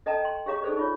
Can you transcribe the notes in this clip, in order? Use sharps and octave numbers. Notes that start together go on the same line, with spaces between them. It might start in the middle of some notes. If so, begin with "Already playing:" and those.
A4 D#5 G5 A5 A#5
G5 C6
G4 G#4 C#5 F5 A#5 D6
D#4 G#4 A4 C5 D5
D#4 F4 C#5